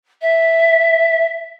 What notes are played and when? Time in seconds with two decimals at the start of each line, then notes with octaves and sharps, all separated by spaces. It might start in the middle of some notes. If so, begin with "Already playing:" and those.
0.21 E5